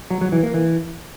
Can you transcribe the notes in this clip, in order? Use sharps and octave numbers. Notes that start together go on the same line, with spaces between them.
F#3
F#3
E3
A#3
E3